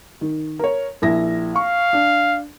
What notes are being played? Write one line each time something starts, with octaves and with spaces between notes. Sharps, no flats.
D#3
A#4 C#5
A#1 E4 A#6
F5 C#6
D4